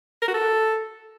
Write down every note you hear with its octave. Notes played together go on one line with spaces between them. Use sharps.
A#4
F#4
A4